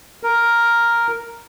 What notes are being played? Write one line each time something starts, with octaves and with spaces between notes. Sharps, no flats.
A#4